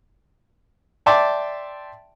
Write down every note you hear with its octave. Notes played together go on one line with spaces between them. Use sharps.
D5 E5 G5 A5 C6 D6